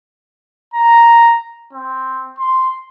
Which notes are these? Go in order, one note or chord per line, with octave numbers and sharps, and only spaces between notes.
A#5
C4
C6